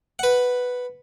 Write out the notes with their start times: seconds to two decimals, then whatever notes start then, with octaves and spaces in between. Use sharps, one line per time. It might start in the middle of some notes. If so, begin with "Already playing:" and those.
0.19 B4 F#5